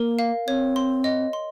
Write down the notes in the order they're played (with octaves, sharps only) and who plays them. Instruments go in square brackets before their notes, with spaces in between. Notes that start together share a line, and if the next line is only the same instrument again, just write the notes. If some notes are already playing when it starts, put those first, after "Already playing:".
Already playing: [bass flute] A#3 [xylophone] A#4
[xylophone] F5
[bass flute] C4 [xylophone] C#5
[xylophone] C6
D#5
C6